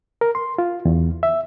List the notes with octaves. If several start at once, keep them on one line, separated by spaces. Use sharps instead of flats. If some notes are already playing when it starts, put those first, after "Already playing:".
A#4
C6
F4
E2
E5